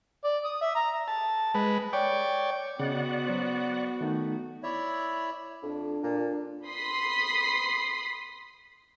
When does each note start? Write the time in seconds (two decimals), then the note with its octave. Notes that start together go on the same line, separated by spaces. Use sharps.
0.24 D5
0.44 D#6
0.61 E5
0.75 A#5
1.08 A5
1.54 G#3 B4
1.93 C#5 D5 G5
2.80 C#3 B3 F#4 D5 D#5 F#5
3.27 F#3 C5
4.01 D#3 A3 D#4
4.63 E4 C#5 D5 E5
5.63 F2 D4
6.03 A#2
6.67 B5 C6 D#6 B6 C7